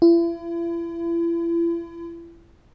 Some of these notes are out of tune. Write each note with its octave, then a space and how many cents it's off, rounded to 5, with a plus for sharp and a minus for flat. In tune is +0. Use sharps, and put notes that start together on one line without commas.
E4 +40